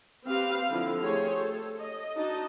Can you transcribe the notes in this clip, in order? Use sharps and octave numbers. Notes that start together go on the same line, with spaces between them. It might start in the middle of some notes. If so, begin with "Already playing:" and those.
C4 G4 B4 F5
D3 F3 C4 E4
A3 G4 G#4 C5 C#5
A4
D#5
D4 D#4 F#4 D#5 A5